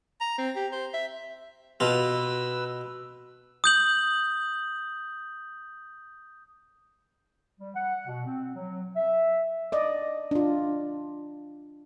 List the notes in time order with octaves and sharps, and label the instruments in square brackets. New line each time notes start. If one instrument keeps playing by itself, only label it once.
[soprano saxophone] A#5
C4
G4
C5
E5
[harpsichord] B2 F4 [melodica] B4 E6
[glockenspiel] D#6 G6 F#7
[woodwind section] G3
F#5
B2
C4
F#3
E5
[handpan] D5 D#5
D4 F4